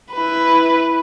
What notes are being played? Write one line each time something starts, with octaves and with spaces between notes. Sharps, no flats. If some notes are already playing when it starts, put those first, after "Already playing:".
E4 B4